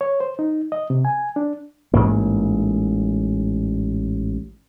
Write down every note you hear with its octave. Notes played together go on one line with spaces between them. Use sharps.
C#5
C5
D#4
D#5
C3
G#5
D4
A1 G#2 A#3